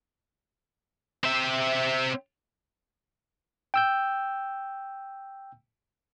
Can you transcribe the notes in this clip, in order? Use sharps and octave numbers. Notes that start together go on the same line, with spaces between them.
C4 E5
G5 E6 G6